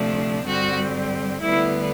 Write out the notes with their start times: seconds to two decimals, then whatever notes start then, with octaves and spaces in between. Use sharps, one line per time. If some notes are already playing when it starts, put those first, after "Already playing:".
Already playing: D2 C3 F3 A3 D4
0.46 G2 D3 G3 C4 F#4
1.41 D2 D3 G3 B3 E4